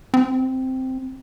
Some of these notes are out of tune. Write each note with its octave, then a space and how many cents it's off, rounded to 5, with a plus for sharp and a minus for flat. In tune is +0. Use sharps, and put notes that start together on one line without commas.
C4 -5